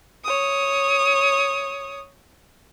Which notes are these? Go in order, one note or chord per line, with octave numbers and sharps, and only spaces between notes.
C#5 D#6